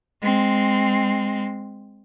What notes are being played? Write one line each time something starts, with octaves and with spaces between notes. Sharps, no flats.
G#3 C4